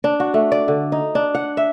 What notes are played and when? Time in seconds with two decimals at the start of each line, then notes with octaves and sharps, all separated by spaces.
0.04 D4
0.20 F#4
0.34 A3
0.52 D5
0.68 D3
0.92 D#4
1.15 D4
1.35 F#5
1.57 E5